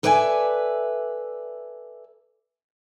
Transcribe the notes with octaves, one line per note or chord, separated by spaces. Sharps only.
A4 B4 D5 E5 F#5 G#5